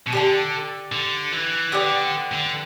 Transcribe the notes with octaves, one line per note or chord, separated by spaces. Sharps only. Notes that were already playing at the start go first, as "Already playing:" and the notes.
B2
D3 G4 D5 A5
D3
E3
D3 B3 G4 D5
D3